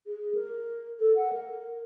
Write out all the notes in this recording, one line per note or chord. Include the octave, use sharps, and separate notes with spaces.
G#4
A#4
A4
F#5
A#4